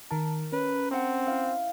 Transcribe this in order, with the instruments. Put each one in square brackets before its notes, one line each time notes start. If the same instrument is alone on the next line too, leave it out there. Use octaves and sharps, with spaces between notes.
[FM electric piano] D#3 A5 [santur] A#4
[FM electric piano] C#4 [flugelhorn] B4
[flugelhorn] C4 [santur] F#5 D#6
[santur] E4 F5